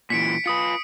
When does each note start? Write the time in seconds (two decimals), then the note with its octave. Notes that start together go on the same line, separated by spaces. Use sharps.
0.10 A#2 E3 B6 C#7 D7
0.46 F4 B4 D#6 C#7